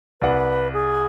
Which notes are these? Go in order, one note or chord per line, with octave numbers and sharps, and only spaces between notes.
C2 B4 D5 F#5
G#4